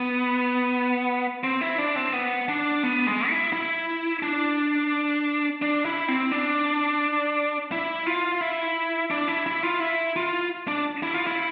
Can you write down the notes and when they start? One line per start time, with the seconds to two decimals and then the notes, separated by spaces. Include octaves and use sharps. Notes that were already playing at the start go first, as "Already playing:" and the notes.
Already playing: B3
1.43 C4
1.61 E4
1.78 D4
1.96 C4
2.13 B3
2.48 D4
2.83 B3
3.07 G#3
3.29 E4
3.53 E4
4.22 D4
5.62 D4
5.85 E4
6.08 C4
6.31 D4
7.72 E4
8.06 F4
8.41 E4
9.10 D4
9.28 E4
9.46 E4
9.63 F4
9.80 E4
10.16 F4
10.68 D4
11.03 E4
11.14 F4
11.27 E4